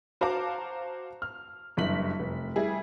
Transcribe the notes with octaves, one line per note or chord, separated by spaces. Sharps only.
F#4 C5 F5 A5 A#5 D6
F6
F#1 G2 E4 B6 F#7
F1
G3 E4 G#4